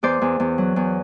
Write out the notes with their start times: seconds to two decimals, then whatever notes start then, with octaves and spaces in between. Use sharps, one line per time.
0.03 E2 C5 D5
0.21 E2
0.40 E2
0.58 F#3
0.76 E2